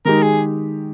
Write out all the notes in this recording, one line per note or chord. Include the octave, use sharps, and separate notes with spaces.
D#3 G#3 D#4 G4 A#4
G#4